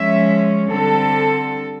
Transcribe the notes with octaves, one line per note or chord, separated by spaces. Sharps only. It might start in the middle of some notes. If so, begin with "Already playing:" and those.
Already playing: F3 G#3 C#4 E5
D3 G3 C4 A4